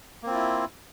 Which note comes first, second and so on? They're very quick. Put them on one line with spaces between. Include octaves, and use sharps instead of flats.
A#3 C4 F4 E4